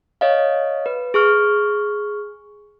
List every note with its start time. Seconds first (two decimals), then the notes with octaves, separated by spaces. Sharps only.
0.21 C#5 D#5 F5
0.86 B4
1.14 G#4 C#6 F6